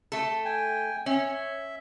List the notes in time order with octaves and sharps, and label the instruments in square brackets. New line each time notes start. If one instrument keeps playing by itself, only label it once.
[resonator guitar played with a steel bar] A3 A4
[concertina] G5 G#5
[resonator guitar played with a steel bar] C#4 [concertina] E5